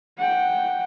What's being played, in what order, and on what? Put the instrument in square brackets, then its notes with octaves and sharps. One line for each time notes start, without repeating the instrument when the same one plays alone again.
[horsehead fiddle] F#5 G5